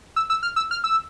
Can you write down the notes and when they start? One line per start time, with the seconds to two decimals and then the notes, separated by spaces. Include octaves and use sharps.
0.16 E6
0.30 E6
0.43 F6
0.56 E6
0.71 F6
0.84 E6